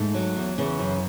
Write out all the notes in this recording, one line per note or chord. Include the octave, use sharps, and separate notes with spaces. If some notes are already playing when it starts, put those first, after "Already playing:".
Already playing: G#2 A3
F#3
E2
C#3 E3 C#4
F#2